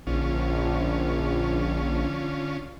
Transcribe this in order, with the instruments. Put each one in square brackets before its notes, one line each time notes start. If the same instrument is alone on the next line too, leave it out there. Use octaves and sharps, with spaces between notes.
[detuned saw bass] A#1 [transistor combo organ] D3 C#4 F4